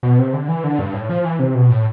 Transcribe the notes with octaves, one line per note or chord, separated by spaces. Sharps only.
B2
C3
D3
E3
D3
G2
A2
F3
E3
C3
B2
A2